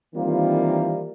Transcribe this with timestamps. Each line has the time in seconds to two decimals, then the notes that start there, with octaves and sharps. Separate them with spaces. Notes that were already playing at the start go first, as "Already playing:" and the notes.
0.14 D#3 E3 G3 A#3 C4 F4